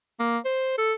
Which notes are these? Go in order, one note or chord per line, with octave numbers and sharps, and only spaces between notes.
A#3
C5
A4